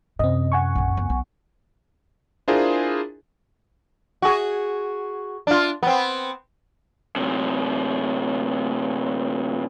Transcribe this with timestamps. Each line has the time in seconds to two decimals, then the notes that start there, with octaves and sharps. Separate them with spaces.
0.19 F#2 C3 C4 D#5
0.52 F#5 G#5 C#6
0.75 A#1 D#3
0.97 C#2 B3
1.10 B1 B3
2.48 D4 E4 F4 G#4 A#4 C5
4.22 F#4 G#4
5.47 D4 F4
5.83 B3 C4
7.16 F#2 C3